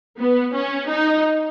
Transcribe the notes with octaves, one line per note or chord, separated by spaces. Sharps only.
B3
C#4
D#4